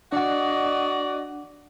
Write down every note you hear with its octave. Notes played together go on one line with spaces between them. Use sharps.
D4 F#4 D5 D#5 F#5